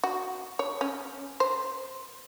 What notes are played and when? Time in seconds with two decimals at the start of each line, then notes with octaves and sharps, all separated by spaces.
0.03 F#4
0.59 C#5
0.81 C#4
1.40 C5